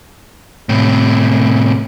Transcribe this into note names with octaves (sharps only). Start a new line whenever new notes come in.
A2 C3